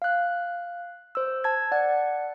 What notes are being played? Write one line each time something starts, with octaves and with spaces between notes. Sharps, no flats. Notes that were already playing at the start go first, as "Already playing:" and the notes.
F5 F#6
C5 E6
A5 G#6
D5 F#5